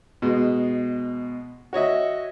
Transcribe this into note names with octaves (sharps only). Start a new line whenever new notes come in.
B2 G#3
F#4 C#5 D#5 E5